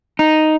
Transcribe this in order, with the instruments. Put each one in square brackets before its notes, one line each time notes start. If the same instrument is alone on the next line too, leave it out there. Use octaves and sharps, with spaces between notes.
[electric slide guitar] D#4